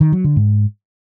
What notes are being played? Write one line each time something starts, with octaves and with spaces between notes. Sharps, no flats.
D#3
F#3
D3
G#2